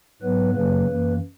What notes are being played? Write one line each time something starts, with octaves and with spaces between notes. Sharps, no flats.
G#2 F#3 B3 B4
F#2 C#3 F#3 A#3 B4
F#2 E3 A#3